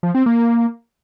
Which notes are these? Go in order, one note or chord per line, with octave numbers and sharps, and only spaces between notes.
F3
C4
A#3